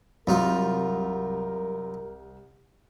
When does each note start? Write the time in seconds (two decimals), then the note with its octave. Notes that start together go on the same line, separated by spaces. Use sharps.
0.27 C2 F#2 D#4 F4 A#4